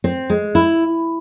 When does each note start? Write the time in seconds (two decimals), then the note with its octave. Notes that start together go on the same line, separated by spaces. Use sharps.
0.04 C4
0.30 G#3
0.55 E4